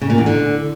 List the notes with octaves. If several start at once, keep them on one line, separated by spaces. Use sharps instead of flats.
C#3
A#2
E2
D3